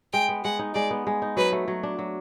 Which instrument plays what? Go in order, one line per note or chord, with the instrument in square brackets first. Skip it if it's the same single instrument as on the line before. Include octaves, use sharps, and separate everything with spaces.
[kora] G#3 [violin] G5
[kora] B3
[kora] G#3 [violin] F#5
[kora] D#4
[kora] G#3 [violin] D5
[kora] B3
G#3
D#4
[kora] F#3 [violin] B4
[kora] A3
F#3
D4
F#3